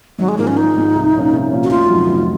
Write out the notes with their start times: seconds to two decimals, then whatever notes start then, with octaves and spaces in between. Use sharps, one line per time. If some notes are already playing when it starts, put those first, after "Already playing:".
0.19 G#1 F#3
0.29 G#3
0.38 G#2 F3 A#3
0.47 C#4
0.57 G#1 D#4
0.76 G#2 F3
0.95 C2
1.14 A#2 F3 A#3 C#4
1.33 C2
1.52 A#2 F3 A#3 C#4
1.64 F#4
1.71 F1 F4
1.90 F2 C3 D#3 F#3
2.09 F1